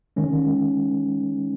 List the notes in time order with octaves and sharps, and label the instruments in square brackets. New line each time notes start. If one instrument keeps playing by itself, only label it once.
[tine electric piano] D#3 G#3 C#4